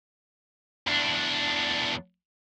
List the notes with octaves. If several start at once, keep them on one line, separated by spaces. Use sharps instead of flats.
E2 D4